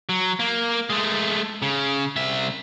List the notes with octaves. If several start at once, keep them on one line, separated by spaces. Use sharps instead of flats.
F#3
A#3
G#3 A3
C#3
C2 E5